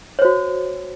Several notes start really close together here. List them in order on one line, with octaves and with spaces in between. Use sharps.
C#5 C5 F#4